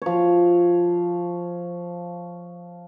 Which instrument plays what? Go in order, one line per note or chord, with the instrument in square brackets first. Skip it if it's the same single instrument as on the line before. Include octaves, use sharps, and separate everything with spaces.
[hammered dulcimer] F3 C#5